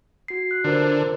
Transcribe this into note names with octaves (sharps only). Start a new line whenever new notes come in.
F#4 C7
F#6
D3 F4 A#4 C5